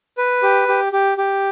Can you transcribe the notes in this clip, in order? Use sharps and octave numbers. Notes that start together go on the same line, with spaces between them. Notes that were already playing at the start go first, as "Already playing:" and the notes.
B4
G4
G4
G4
G4